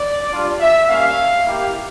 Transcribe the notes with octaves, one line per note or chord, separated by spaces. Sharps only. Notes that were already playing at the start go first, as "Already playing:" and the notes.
Already playing: D5
G3 D4 F4
E5
G3 A#3 C#4 F5
A#3 E4 G4